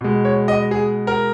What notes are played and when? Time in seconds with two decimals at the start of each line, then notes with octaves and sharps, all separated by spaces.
0.01 B2 G#3
0.25 C#5
0.48 D#5
0.71 G#4
1.07 A#4